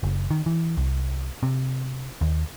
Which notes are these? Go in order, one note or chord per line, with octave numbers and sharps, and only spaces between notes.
F#1
D#3
E3
C2
C3
D#2